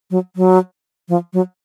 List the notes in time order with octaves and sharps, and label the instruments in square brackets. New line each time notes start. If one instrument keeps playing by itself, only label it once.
[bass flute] F#3
F#3
F3
F#3